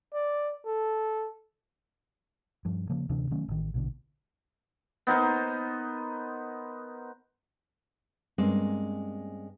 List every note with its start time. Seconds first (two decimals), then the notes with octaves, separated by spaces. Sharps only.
0.14 D5
0.66 A4
2.65 G2 F3
2.89 C#3 F3 A#3
3.09 D2 C3 E3 D4
3.31 D#3 F#3 A3 C#4
3.48 A1 D#3
3.74 A#1 B2 D3
5.07 B3 D#4 A#4 C5
8.38 G2 G#3 A#3 C4 C#4